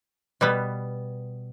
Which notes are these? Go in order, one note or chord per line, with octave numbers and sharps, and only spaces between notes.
B2 G3 B3